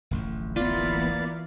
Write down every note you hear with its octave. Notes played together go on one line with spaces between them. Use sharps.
D1 A1 F2
E3 A#3 B3 F4 D5 F5